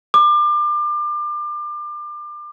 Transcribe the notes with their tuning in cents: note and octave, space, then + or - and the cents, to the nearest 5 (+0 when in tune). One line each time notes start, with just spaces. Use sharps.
D6 +30